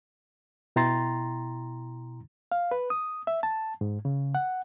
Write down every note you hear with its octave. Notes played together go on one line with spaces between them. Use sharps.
B2 E4 G5 A#5 C6 A6
F5
B4
D#6
E5
A5
G#2
C#3
F#5